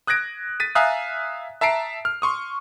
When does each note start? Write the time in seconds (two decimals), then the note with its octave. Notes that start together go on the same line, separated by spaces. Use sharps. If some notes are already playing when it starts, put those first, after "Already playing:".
0.07 D#6 F#6 G#6 A#6 D7
0.60 A6 B6 D#7
0.75 E5 F5 G#5 A#5 D#6 F#6
1.61 E5 A5 A#5 C7 D7
2.05 F6
2.22 C6 C#6 D#6